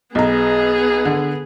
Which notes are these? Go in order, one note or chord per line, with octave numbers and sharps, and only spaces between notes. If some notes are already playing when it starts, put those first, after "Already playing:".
B1 B3 G#4 A#5
D3